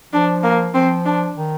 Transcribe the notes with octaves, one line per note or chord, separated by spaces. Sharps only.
F3 D4
A#3
F3 C4
D4
D#3